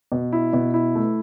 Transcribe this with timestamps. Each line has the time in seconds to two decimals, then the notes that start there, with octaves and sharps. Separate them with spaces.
0.12 B2
0.33 E4
0.53 B2
0.74 E4
0.95 A3